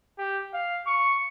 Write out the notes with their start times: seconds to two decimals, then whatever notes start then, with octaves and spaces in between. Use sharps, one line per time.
0.19 G4
0.54 F5
0.86 C#6